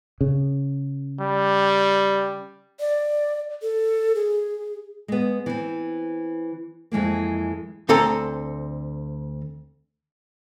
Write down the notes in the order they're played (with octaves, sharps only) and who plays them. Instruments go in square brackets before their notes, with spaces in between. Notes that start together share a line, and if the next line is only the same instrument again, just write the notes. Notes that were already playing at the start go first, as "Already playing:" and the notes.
[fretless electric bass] C#3
[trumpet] G3
[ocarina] D5
A4
G#4
[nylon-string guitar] G#3 B3
E3 C4
F2 E3 G#3 A#3
[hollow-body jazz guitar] D2 C4 A4 G#5 A#5